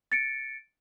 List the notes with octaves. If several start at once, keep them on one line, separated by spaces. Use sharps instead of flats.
A6 C#7 D7